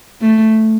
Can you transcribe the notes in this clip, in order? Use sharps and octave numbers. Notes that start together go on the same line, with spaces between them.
A3